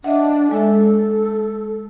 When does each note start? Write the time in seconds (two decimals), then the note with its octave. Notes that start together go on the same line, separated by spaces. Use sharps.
0.04 D4 D#5 E5 F#5
0.51 G#3 A4 E5